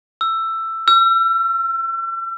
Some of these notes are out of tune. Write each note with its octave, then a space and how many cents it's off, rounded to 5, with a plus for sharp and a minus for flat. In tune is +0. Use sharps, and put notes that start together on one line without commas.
E6 +15
E6 +40